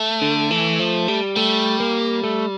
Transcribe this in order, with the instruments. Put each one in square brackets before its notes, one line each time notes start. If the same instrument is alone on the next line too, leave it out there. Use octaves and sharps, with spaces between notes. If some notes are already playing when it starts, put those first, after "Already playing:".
Already playing: [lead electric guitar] A3
[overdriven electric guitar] D3
E3
F3
G3
[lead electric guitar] G3 [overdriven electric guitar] A3
[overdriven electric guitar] A#3
A3